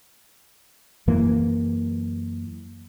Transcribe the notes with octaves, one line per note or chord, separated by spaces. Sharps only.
F#2 E3 A#3